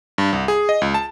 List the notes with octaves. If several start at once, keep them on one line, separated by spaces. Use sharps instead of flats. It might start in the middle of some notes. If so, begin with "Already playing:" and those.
G2
C2
G#4
D#5
C#2
A5